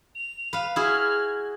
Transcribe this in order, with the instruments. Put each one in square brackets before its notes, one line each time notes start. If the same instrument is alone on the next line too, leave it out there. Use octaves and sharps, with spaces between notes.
[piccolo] F7
[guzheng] B4 F5
[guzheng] E4 F#4 G#4 [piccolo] F6